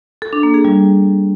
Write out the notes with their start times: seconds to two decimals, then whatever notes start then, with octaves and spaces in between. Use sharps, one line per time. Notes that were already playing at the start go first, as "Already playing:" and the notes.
0.22 A4
0.33 D4
0.43 A#3
0.54 G#4
0.65 G3